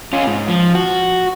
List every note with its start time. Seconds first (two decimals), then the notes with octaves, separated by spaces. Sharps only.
0.13 C#4 F4
0.27 G#2
0.48 F3
0.75 F#4